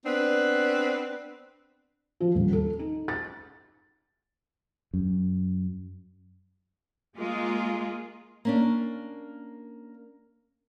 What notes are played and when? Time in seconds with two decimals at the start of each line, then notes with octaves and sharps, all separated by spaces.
0.05 B3 C4 D4 B4
2.20 F3
2.35 D#1
2.53 A4
2.79 D#4
3.08 A6
4.94 F#2
7.18 G#3 A#3 F4 G#4
8.45 A#3 C#4 D4